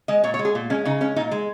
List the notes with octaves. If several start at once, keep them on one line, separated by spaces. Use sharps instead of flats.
G#3 D#5
A#2 C#5
C#5
G#3
G#4
A#2
G#3 C#4
C#3 D#4
G#3 C#4
A#2 D#4
G#3